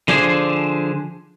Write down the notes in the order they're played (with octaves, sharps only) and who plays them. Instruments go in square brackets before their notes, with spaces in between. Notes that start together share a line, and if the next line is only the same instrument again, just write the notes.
[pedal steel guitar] D3 F3 D4 G#4 C5